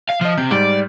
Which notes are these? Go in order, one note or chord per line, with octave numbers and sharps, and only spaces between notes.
F5
F3 D#5 F6
C3 G6
G#2 G3 D5